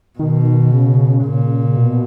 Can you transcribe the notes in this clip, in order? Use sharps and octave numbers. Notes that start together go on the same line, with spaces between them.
B2 D#3
C#3
A#2
B2